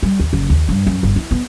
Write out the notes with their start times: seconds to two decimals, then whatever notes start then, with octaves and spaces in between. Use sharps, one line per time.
0.03 G3
0.20 D#2
0.33 F#1
0.50 D#2
0.69 G2
0.87 F#2
1.03 G1
1.16 E4
1.31 B3